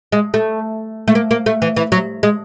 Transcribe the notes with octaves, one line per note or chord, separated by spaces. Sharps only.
G#3
A3
A3
A#3
A#3
A3
E3
E3
F#3
G#3